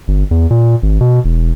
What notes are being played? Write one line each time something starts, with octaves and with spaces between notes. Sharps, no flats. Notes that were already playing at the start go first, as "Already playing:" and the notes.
G1
E2
A#2
G#1
B2
E1